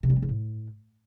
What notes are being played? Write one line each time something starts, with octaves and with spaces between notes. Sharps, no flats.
C3
G3
C4
C#3
A2